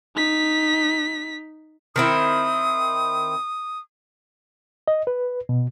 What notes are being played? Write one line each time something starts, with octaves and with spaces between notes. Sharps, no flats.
D#4 B6
D#3 C4 E4 D#6
D#5
B4
B2